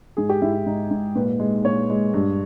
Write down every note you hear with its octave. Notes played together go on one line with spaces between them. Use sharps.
G#2 G#4
G4
G#2 E4
E4
G#2 D#4
G#2
A#2 B4
G#3
A#2 C#5
G#3
G2